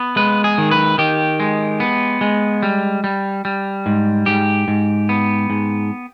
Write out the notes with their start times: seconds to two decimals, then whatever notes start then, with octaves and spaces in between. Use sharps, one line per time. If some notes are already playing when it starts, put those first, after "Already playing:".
Already playing: B3
0.16 G#3 B4
0.44 G#4
0.58 D#3
0.71 B4
0.98 D#3 G4
1.40 G#3
1.80 B3
2.21 G#3
2.63 G3
3.04 G3
3.45 G3
3.86 G#2
4.26 G#2 G4
4.68 G#2
5.09 B3
5.50 G#2